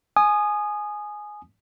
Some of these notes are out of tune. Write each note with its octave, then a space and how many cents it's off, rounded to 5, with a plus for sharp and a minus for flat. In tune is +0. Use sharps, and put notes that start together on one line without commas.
G#5 +10 D#6 -20